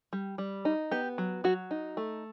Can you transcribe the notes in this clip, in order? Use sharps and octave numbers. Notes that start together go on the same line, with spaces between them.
G3
G3
D#4
B3 G4
F#3
F#3 F#4
D#4
A3